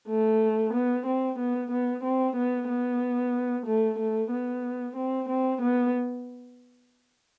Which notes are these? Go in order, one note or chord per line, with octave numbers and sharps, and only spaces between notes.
A3
B3
C4
B3
B3
C4
B3
B3
A3
A3
B3
C4
C4
B3